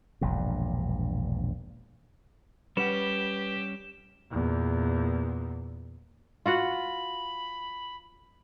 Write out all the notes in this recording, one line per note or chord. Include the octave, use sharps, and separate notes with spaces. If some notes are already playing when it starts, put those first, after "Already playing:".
E1 A#1 G2
G3 C#4 G4 B4 F#5 E7
E2 A#2
F4 F#4 F#5 B5